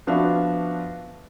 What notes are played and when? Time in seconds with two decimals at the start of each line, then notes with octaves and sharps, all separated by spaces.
0.07 F3 B3 D4 F#4 E5 F5